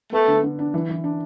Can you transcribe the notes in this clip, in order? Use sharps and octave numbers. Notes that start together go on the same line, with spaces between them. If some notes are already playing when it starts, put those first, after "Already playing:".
A3 B3
D3
D3
D4
E3
E3
D4